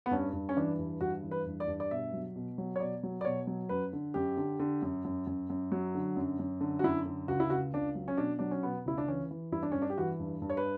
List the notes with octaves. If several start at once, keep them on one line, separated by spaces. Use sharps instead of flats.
B3
G2 C#4
G2
C#4
E3 D4
G2
G2 F#4
E3
B4
G2
D5
G2
D5
B2 E5
F#3
B2
F#3
C#5
B2 D5
F#3
D5
B2 C#5
F#3
F#2 B4
D3
F#2 G4
D3
D3
F#2
F#2
F#2
F#2
F#3
D3
F#2
F#2
D3
F#4
F#2 E4
D3
C#2 F#4
E4
C#2 F#4
C#2 D4
F#3
C#4
B2 D4
F#3 D4
C#4
B2 B3
C#2 E4
D4
E3 C#4
E3
G2 E4
D4
G2 C#4
D4
G4
E3 F#4
G2
G2
C#5
B4